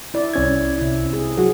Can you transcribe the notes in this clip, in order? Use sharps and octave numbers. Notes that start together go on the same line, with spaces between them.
E4 D5
C2 C#4 G#6
C3 E4
G#4
F#3 F#4 G#4